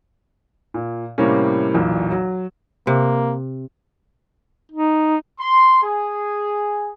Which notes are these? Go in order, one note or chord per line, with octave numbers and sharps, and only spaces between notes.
A#2
A2 C3 G3 A#3 C#4
B1 E2 A#2
F#3
C3 A#3
D#4
C6
G#4